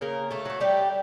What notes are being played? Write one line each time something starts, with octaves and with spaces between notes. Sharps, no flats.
C#3 A#3 A#4
A3 A4
F#3 A3
G3 G4